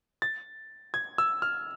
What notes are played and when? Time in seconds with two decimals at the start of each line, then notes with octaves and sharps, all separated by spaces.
0.22 A6
0.94 G#6
1.18 E6
1.42 F6